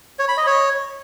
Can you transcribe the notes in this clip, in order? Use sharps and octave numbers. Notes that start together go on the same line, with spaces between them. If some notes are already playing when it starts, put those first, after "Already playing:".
C#5
B5
D#5
C#5